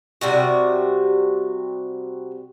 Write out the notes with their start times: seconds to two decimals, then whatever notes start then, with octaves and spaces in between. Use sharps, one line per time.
0.21 C3 G3 F#4